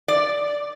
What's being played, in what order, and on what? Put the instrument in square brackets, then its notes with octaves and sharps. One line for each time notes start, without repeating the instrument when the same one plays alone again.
[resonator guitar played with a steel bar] D5